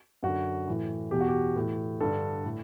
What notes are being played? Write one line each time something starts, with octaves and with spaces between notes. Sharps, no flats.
F#2 D3 F#4
A2 E3
E2 B2 G4
F#4
G4
A2 E3
G2 D3 A4
A2